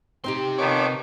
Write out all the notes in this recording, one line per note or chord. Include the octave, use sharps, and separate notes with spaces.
C3 C4 D#4 G4 C6
D#3 F3 B3 C#5 D6